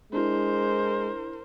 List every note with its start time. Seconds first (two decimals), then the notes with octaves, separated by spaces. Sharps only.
0.13 G#3 D4 E4 A#4 C5